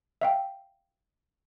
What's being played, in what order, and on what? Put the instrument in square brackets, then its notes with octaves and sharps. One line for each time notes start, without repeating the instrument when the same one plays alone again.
[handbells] E5 F5 G5